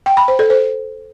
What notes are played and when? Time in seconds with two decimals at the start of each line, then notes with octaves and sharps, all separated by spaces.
0.06 G5
0.17 B5
0.28 C5
0.39 A4
0.50 C5